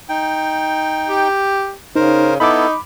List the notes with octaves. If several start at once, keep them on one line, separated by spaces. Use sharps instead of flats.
D#4 G5
G4
C#3 D#4 A#4 C5
B3 D#4 E4 A4 B5 D6